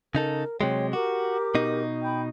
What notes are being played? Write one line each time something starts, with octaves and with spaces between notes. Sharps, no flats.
C#3 D#4 A4 A#4
C3 F#3 G#3 C#5 G5
F#4 G4 A#4 D6
B2 D#4
G5 B5 G6